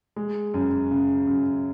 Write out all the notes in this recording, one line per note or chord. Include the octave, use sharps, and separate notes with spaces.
G#3
F#2
C#3
F#2